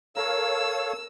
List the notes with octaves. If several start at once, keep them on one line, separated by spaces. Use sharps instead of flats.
A4 A#4 C#5 F5 E6